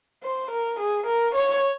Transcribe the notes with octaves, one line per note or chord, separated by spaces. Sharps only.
C5
A#4
G#4
A#4
C#5